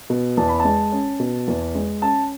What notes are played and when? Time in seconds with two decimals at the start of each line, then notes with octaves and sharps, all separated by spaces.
0.10 B2
0.37 E2 A5
0.48 B5
0.60 A5
0.65 G#3
0.92 C#4
1.20 B2
1.48 E2
1.75 G#3
2.02 C#4 A5